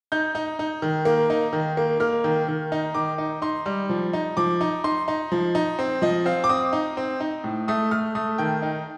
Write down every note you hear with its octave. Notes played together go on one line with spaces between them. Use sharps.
D#4 G6
D#4
D#4
D#3
A#3
D#4
D#3
A#3
A#3 F6
D#3
D#3
D#4
D#3 D6
D#4
D#4 C6
G3
F3
D#4
F3 D6
D#4
D#4 C6
D#4
F3
D#4
C4
F3 D#5
C4 F5
D6
C4 D#6
D#4
C4
D#4
A2
A3 D#6
A3 F6
A3 D#6
D#3 G5
D#4